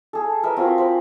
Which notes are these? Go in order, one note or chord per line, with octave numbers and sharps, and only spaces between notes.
G#4 A4
A#4 B4 E5
C4 F4 F#4 A#4
C5 B5